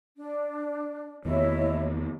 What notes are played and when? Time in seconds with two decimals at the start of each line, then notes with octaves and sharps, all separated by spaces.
0.16 D4
1.25 E2 D#3 B3 E4 C#5 D#5